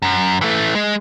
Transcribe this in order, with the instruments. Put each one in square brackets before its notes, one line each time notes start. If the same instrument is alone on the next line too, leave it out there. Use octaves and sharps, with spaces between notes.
[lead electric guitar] F#2
E3 A3
G#3